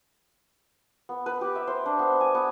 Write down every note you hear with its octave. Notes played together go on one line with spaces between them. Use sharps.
B3
B4
G4
E5
C5
D4
B3
G#5
B3